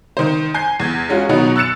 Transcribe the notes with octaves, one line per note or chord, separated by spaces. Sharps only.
D#3 C5
G#5 G6 C7
E2 G#6
G#3 C#4 F4 F#4
B2 D#3 F#3 B3 D#4 F#4
E6 F#6 A6 C#7 E7